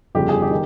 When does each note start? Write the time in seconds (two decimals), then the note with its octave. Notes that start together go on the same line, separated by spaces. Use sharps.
0.15 G1 F2 C#3 G4
0.29 G#4
0.42 G4
0.51 D#3